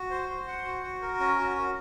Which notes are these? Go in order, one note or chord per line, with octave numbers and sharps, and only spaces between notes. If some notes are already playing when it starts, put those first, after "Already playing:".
Already playing: F#4
C5
C5
F#5
F#4
F#4
A#4
C#4
F#4
F#4